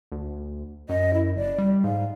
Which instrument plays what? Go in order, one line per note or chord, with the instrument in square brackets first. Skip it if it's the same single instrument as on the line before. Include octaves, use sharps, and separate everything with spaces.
[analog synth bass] D2
[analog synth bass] F#2 [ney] D#5
[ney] E4
[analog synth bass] F#1 [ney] D5
[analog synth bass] G3
[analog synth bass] G#2 [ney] F5